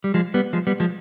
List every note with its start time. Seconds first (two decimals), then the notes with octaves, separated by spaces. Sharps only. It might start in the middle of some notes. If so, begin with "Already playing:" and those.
0.04 G3
0.14 F3 G#3
0.34 G3 B3
0.53 F3 G#3
0.67 G3 B3
0.80 F3 G#3